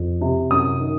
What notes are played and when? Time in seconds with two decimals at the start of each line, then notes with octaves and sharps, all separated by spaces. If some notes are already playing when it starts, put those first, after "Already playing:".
Already playing: F2
0.21 C3
0.51 F#2 D#6
0.80 D#3